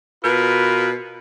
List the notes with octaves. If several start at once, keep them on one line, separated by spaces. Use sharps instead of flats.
B2 F4 A#4 B4